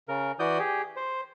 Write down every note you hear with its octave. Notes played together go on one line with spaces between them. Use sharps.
C#3 A#4
E3 F#4 D5 D#6 G6
G4 G#4
C5